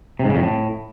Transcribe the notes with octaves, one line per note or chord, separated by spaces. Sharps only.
C3
G#2
C#3
F2
A2